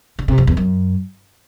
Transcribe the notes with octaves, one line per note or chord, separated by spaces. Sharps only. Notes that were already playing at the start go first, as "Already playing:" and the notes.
D3
C3
F2
E2
F#2